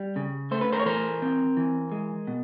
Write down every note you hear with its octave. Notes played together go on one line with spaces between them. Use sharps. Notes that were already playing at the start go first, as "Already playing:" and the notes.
Already playing: G3
C#3
A3 C5
B4
A#4 C5
C#5
E3 A#4 C5
C4
E3
G#3
B2